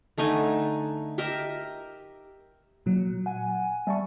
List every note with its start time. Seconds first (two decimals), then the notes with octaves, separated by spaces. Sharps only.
0.18 D3 A3 D#4 G#5
1.18 G4 A#4 D#5 E5
2.86 A#2 F#3
3.26 F#5 G#5
3.87 G3 E5 A5 C#6